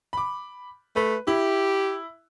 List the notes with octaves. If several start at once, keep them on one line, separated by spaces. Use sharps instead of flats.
B5 D6
A3 B4
E4 G4